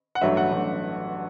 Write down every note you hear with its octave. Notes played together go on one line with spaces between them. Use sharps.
F#5
A1 G2 F#3 A3 E5
F#5
A1 G2 F#3 A3